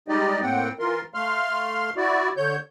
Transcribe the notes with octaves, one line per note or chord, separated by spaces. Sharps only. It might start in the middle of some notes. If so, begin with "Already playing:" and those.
G3 G#3 D#4 G4 D5 D#5
A2 A#3 C4 F#5 G5
E3 F4 A#4 C6
A3 F5 C6 F6
E4 F#4 D5
D3 C#5 G6